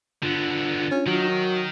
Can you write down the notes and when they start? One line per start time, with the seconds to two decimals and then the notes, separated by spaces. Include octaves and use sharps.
0.23 D3 B3 D4 F4
0.91 C#4
1.07 D#3 F#3